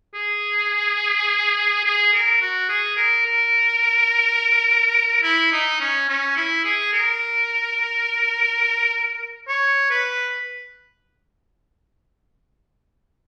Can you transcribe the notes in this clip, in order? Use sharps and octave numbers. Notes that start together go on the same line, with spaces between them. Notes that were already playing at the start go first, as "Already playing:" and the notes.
G#4
G#4
A#4
F#4
G#4
A#4
A#4
E4
D#4
C#4
C#4
E4
G#4
A#4
C#5
B4